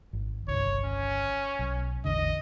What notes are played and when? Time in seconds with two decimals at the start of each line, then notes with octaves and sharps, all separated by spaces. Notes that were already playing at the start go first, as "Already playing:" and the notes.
0.13 G#1
0.48 G1 C2 D#3 C#5
0.84 C#4
1.59 B1
2.05 A1 E2 D3 D#5